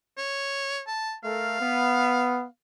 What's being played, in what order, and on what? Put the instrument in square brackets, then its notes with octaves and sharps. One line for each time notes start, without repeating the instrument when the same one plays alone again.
[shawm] C#5
A5
[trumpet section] A3 A4 A#4 [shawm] F5
[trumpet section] B3